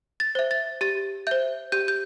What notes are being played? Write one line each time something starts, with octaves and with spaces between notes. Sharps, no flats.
A6
C5 E5
A6
G4 A6
C5 E5 G6
G4 G6
G6